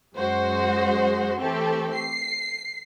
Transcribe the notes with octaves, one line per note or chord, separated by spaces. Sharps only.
F#2 G#3 F#4 C5
E3 A3 C4 G4 A4
C7